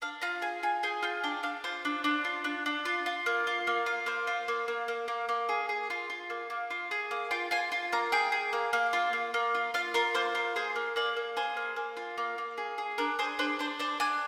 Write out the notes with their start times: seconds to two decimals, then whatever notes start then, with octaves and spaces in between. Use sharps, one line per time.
0.02 D4 F5
0.22 F4 A#5
0.42 G#4 G#5
0.63 F4 G#5
0.83 G#4 G5
1.02 F4 G5
1.24 D4 G5
1.43 D4 F5
1.64 F4 C5
1.85 D4
2.04 D4
2.25 F4
2.44 D4
2.66 D4
2.85 F4
3.06 F4
3.26 A#3
3.47 F4
3.67 A#3
3.86 F4
4.06 A#3 C5
4.27 F4
4.48 A#3
4.68 A#3
4.88 A#3
5.08 A#3
5.29 A#3
5.49 G#4
5.69 G#4
5.90 F4
6.10 F4
6.30 A#3
6.50 A#3
6.70 F4
6.91 G#4
7.11 A#3
7.31 F4 G5
7.51 F4 G#5
7.72 F4
7.92 A#3 A#5
8.12 G#4 G5
8.32 G#4
8.53 A#3
8.73 A#3
8.93 F4
9.13 A#3
9.34 A#3
9.55 F4
9.74 F4 F5
9.94 F4 A#4
10.15 A#3 C5
10.35 F4 A#4
10.56 G#4 C5
10.76 A#3
10.96 A#3 D5
11.17 A#3
11.37 G#4 C5
11.57 A#3
11.76 A#3
11.97 F4
12.18 A#3
12.38 A#3
12.58 G#4
12.78 G#4
12.98 D4 A#4
13.19 G#4 C5
13.39 D4 C5
13.59 D4 C5
13.79 D4 C5
14.00 D4 G#5